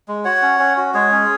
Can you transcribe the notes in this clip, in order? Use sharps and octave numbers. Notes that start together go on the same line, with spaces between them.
G#3
F#4 C#5 F#5
C#4
C#4
F#4
G#3 G#4 C#5
C#4